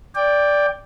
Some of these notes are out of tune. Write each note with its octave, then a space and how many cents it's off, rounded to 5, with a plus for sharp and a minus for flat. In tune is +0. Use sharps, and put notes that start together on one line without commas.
D5 -5 G5 +15